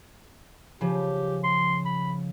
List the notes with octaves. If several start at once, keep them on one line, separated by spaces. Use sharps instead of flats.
C#3 F3 G4
C6
B5